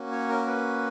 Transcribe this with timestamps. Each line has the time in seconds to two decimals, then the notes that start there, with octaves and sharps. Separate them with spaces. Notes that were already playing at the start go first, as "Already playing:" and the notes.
Already playing: A#3 C#4 F#4
0.11 C#5
0.28 A#4
0.47 B4